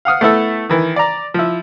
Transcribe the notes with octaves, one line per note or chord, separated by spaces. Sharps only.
F5 F#5 D#6 F6
A3 B3 E4 A4
D#3 E3
D5 A#5
F3 E4